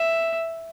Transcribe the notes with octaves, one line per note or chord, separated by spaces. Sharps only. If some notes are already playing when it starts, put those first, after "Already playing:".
Already playing: E5